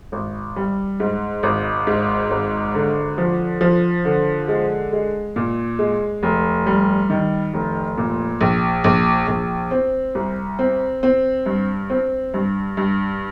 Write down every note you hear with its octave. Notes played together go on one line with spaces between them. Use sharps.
G#1
G3
G#2
G#1
G#2
G#1
D3
F3
F3
D3
G#3
G#3
A#2
G#3
F1
G3
D#3
F1
A#2
A#1
A#1
A#1
C4
C2
C4
C4
G2
C4
G2
G2